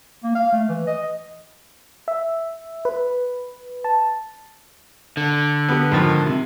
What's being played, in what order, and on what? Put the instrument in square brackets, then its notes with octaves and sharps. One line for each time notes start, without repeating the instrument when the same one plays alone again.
[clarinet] A#3
F5
A3
E3
D#5
[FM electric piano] E5
B4
A5
[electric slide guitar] D3
[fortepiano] B3 G4
G#2 D#3 F3
C3